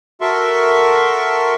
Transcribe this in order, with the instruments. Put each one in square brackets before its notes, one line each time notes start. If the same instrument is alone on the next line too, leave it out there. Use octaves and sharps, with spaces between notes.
[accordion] F#4 A4 A#4 E5 C6 C#6